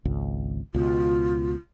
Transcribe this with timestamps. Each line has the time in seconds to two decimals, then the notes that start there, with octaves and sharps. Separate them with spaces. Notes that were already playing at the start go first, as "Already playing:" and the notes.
0.05 G#1 C#2
0.75 C#2 B2 F4